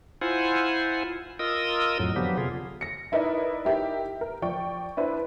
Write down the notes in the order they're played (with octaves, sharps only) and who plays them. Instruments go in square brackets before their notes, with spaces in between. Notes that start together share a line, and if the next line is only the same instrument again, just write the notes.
[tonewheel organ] E4 F4 C5 F#5 G#5
F4 A#4 D#5 D#6 E6
F2 A2 F#3
D3 F3 F#3 B3 G4
C3 F4 G#4
[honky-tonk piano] A#6 C#7
D#4 E4 A#4 B4 D5 D#5
D#4 E4 G4 A#4 E5
A#4
F3 D5 G5 C#6
D4 E4 B4 C5